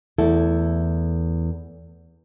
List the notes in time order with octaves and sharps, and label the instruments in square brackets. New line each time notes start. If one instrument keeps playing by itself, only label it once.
[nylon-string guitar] E2 A3 E4 A4